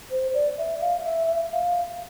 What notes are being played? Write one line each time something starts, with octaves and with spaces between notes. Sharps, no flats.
C5
D5
E5
F5
E5
F5